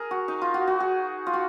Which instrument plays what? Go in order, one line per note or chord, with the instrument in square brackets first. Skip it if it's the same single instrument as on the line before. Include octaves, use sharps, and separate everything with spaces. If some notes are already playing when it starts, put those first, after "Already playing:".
Already playing: [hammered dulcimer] G#4 A#4
F#4
D#4
F4
F#4
F#4
G#4
F4
F#4